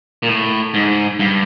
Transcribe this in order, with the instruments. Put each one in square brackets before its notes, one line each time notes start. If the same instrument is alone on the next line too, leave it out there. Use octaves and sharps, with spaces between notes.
[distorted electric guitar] A#2
A2
G#2
G2